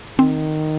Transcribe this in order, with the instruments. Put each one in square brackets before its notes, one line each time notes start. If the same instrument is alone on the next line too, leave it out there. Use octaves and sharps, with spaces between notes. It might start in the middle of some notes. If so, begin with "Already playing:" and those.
[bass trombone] D#3 [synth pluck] C4